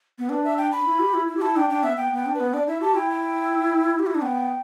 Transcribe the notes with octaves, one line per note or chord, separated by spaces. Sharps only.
B3
D4 B4
E5
G5
B5
E4
G4
E4
E4
G4
E4 A5
D4 G5
D4 G5
B3 E5
B3 G5
B3 G5
D4
B4
B3
D4 D5
E4 E5
G4 A5
E4 G5
G5
G4
E4
D4
B3 G5